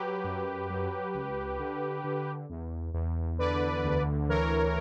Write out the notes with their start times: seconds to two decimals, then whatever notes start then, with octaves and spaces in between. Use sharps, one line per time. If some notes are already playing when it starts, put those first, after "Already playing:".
Already playing: F#3 G4 B4
0.24 F#2
0.70 F#3
1.14 C#2
1.59 D3
2.04 D3
2.49 E2
2.94 E2
3.39 D3 B4 D5
3.84 D2
4.29 E3 A#4 C#5